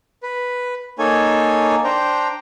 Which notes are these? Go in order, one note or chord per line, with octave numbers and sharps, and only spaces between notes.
B4
A#3 D#4 A4 C#5 G#5
D4 C5 G5 A#5